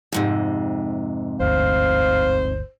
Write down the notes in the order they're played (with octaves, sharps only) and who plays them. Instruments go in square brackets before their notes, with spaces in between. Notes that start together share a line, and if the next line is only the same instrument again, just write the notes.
[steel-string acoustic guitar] F2 G#2 C3
[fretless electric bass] G1 D2 [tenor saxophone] C5 [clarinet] F5